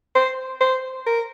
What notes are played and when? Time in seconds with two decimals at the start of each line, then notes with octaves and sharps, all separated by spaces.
0.15 C5
0.60 C5
1.06 A#4